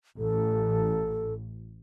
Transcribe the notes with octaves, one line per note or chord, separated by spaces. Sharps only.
A1 A4